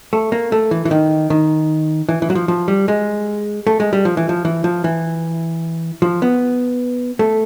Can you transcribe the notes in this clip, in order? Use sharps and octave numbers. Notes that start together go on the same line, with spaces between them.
A3
A#3
A3
E3
E3
D#3
D#3
E3
E3
F#3
F3
F3
G3
G#3
A3
G#3
G3
F3
E3
F3
E3
F3
E3
F3
B3
A3